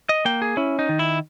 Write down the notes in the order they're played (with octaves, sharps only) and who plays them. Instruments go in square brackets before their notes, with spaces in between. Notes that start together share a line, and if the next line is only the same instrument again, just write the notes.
[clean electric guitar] D#5
A#3 G5
G#4
C#4 E4
D#4
D#3
E4